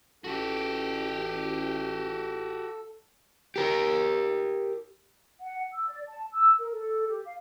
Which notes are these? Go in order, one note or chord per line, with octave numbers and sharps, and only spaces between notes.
A1 F#4 G4 A4
G4 A#4
F#5
E6
D5
A5
E6
A#4
A4
G4
F5